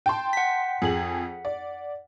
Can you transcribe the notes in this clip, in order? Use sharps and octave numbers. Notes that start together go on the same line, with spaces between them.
G5 A5 C6
F#5 B6
F2 G#4 F#7
D5